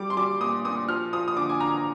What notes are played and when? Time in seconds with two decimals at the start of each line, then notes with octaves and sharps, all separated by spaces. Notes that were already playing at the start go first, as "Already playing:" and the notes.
Already playing: G3 D6
0.10 C6
0.17 G3 D6
0.41 A#2 D#6
0.65 A#2 D#6
0.88 F3 F6
1.13 F3 D#6
1.28 D#6
1.36 D3 D6
1.49 G#5
1.60 D3 A#5